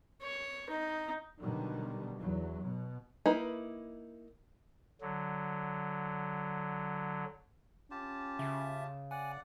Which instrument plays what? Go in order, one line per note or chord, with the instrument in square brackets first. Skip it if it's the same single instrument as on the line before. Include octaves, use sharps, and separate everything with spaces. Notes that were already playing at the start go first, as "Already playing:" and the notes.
[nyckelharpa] C#5
D#4
[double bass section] B2 D3 D#3 F#3 G3
E2 F#3
B2
[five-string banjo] A#3 D#4 E4 B4
[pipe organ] D3 F#3
[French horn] C#4 [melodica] F4 G4 A5
[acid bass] C#3 [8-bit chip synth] E5
[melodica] D5 F#5 [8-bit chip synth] G#5